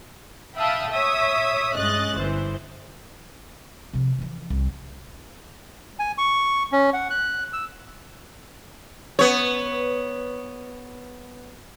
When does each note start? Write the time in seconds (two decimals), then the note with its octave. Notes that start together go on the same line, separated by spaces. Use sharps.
0.57 E5 F5 G5 A5 B5 D#6
0.91 C#5 E5 D#6 B6
1.77 G2 G#3 C#4 D#5 F#6 A6
2.16 G1 E3 C5
3.93 C3 F3
4.19 E3 F3
4.50 C2
5.99 G#5
6.18 C#6
6.72 C#4
6.94 F#5
7.10 F#6
7.53 E6
9.19 B3 C#5